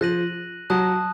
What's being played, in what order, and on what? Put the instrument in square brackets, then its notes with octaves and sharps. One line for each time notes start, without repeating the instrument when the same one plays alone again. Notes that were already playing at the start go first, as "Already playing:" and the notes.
[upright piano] F3 [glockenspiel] F#6 A#6 D#7 F#7
[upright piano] F#3 [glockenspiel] A5 D#6 F#6